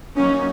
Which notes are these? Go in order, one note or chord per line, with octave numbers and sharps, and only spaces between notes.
F#3 A#3 C#4 D#4